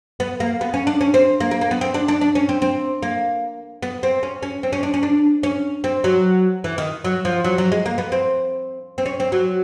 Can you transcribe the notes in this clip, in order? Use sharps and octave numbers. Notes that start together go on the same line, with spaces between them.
B3
A#3
B3
C#4
D4
C#4
C4
A#3
A#3
A#3
B3
C4
D4
D4
D4
C#4
C4
C4
A#3
B3
C4
C#4
C#4
C4
C#4
D4
C#4
D4
C#4
C4
F#3
E3
D#3
F#3
F3
F#3
F#3
G#3
A#3
B3
C4
C4
C#4
C4
F#3